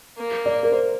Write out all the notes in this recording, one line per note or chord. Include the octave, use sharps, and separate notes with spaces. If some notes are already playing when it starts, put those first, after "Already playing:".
A#3
D5
A#4
C5